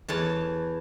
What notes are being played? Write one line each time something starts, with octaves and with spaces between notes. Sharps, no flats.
E2 C#5 A5